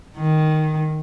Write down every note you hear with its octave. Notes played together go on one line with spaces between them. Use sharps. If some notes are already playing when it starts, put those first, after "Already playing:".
D#3